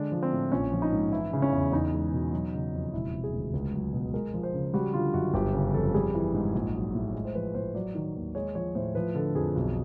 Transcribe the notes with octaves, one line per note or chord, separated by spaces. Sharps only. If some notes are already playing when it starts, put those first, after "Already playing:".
Already playing: D3 G#3 D4
F3
C4
A2
A#1 C#4
F3
D#4
G#2
E3 E4
C#3
C#4
E2
E2 D#4
G#3
B2
F#3
C#3
F2
E1 E4
C3
G#4
D2
C#2
F#3
B2
G#3 A#4
F3
C5
C#3
G3 F#4
D3 F4
F#2 F#4
G1 G4
C#3
F2 A4
G3 G#4
E3
G#2
A#1
F#3
A2
G#3
C5
F3 B4
A2 C5
F#3 D5
D#3
D#2
G#3 C#5
F3 C#5
A2 C5
F3 B4
D3 A4
F2 G#4
B1